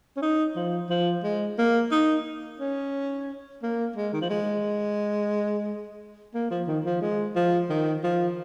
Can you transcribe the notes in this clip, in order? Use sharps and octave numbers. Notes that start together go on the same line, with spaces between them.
C#4
D#4
F3
F3
G#3
A#3
D#4
C#4
A#3
G#3
D#3
F3
G#3
A#3
F3
D#3
F3
G#3
F3
D#3
F3